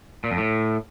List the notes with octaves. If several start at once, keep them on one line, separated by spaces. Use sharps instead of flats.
A#2
F2
A2